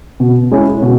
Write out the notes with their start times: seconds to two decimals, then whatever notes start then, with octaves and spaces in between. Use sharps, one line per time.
0.20 B2
0.51 G#3 C#4 E4
0.82 B2